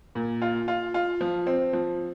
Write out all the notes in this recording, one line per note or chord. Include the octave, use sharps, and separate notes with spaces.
A#2
F4
F4
F4
F3
C4
F3